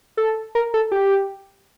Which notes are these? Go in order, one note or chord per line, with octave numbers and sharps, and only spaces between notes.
A4
A#4
A4
G4